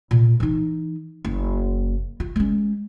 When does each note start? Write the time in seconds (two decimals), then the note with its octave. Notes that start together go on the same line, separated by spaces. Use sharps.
0.11 A#2
0.40 E3 D#4
1.25 F#1
2.20 F4
2.36 G#3 C#4